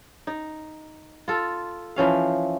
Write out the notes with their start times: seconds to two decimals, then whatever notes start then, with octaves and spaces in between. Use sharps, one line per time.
0.27 D#4
1.28 F4 A4
1.96 E3 F3 C#4 F5